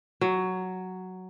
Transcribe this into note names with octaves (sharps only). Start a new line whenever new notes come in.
F#3